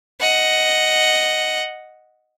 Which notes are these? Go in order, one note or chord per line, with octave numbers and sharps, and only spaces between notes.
D#5 F#5